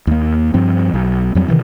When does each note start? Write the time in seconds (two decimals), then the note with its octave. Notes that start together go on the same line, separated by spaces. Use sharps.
0.07 D#2 A#3
0.54 G2 F3 C4
0.94 B1
1.35 F2 F#3 G3 C4
1.48 C3 D#3 E3